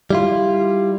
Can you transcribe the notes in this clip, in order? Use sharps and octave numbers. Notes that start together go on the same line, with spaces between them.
G3 E4 F4